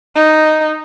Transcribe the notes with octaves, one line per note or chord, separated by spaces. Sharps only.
D#4